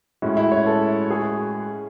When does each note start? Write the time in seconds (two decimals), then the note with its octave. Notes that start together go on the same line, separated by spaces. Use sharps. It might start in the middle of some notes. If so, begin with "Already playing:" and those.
0.22 A2 G#3 C#4 E4 F#4
0.37 E4
0.52 C#5
0.67 A4
1.11 G#4